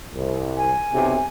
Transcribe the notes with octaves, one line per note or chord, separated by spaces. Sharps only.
C2
G#5
B1 C3